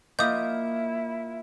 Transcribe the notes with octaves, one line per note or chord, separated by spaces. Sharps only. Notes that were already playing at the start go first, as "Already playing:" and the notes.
A#3 E4 F4 D#5 F5 D6 D#6 G6